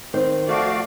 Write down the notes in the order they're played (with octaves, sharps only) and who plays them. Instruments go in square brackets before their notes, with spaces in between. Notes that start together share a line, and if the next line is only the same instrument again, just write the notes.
[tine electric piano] D#3 [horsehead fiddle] C4 [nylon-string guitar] C5
[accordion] F3 F#4 F5 [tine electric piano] A3 [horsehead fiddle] D5